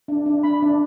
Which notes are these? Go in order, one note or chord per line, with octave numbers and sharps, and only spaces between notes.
D4
D4
D4 B5
D4